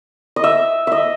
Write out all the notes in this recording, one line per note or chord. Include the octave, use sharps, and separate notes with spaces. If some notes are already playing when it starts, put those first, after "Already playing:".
D#5
E5
D#5 E5